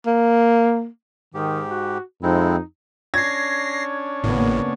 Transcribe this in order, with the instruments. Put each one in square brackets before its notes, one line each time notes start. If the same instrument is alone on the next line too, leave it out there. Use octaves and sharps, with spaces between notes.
[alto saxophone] A#3
[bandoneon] G#2 G4 [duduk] D#3
[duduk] F#4
[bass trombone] F2 [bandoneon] G#3 C4 E4 [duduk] D#4
[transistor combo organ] C#4 D4 C#5 [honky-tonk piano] G#6 [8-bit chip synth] A#6 C7
[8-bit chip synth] G#1 A2 [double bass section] C#3 A#3 B3